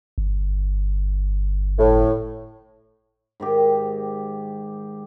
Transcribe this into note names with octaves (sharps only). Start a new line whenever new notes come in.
G1
A2
G#2 D#3 G4